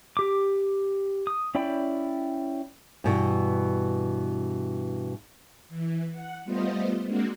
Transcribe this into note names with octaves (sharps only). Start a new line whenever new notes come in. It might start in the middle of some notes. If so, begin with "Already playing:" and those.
G4 D6
D#6
C#4 E4 D5 G5 B5
G2 B2 E3
E3
F#5
G3 A3 B3 F4 C5 D#5
G#3 A#3 C4 D4 F#4